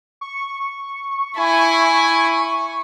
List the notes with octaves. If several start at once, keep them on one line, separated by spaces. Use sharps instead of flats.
C#6
E4 G#5